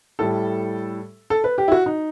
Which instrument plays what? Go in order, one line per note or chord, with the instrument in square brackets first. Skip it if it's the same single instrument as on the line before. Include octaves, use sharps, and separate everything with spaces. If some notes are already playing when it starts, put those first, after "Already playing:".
[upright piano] A2 G3 A4
A4
B4
G4
E4
F#4
D#4